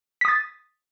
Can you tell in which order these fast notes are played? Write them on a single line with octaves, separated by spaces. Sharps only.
B6 D#6 A6